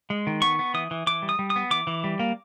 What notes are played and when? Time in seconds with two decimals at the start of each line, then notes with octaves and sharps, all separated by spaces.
0.10 G#3
0.27 D#3
0.42 B3 C#6
0.59 B3
0.74 E3 D#6
0.91 E3
1.07 E3 D6
1.22 G3
1.29 D#6
1.39 G3
1.50 D#6
1.56 B3
1.71 E3 D6
1.87 E3
2.04 G3
2.19 A#3